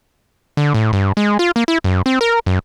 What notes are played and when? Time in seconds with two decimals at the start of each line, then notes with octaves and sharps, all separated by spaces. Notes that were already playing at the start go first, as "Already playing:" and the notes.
0.57 D3
0.74 A2
0.93 G2
1.17 G#3
1.39 F4
1.56 A#3
1.68 E4
1.84 F#2
2.06 C4
2.21 A#4
2.46 F#2